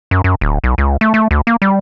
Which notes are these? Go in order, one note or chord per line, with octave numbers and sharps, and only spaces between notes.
F#2
F#2
D1
B1
C#2
A3
A3
D2
A#3
G3